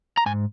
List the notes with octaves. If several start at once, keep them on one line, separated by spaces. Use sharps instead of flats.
A#5
G#2 G#5